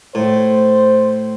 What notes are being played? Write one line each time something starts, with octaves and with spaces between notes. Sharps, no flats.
A2 C5